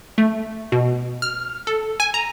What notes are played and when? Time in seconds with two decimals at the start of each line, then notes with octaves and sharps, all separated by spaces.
0.18 A3
0.72 B2
1.22 F6
1.67 A4
2.00 G#5
2.14 A#5